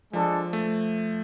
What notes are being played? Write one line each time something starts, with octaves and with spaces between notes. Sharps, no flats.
F3 G#3 D4 A4
A3